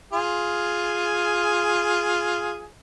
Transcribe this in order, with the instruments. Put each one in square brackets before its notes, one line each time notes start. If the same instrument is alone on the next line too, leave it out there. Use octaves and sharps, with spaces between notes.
[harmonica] F4 G#4